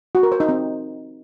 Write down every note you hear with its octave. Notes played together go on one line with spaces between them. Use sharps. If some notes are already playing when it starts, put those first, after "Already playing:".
F#4
A#4
C5
D#4
C4